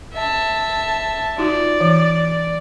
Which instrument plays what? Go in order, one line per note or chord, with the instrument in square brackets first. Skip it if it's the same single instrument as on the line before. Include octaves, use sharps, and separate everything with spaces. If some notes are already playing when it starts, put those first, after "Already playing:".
[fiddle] E5 A5
[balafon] D#4 F4 F#4 [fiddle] D5
[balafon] E3